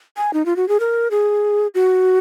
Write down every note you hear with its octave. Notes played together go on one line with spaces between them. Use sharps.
G#5
D#4
F4
F#4
G#4
A#4
G#4
F#4